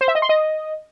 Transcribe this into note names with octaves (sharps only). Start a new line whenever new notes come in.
C5
E5
D#5
C6
D#5